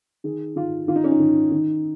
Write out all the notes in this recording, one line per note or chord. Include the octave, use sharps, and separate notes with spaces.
D#3 G#4
D#3 F4
D#3 F4
D#4
C#4
D#4
D#3
D#3